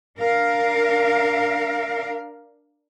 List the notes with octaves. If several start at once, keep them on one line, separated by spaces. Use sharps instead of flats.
D4 A#4 F5